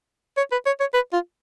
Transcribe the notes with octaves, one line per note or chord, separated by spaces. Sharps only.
C#5
B4
C#5
C#5
B4
F4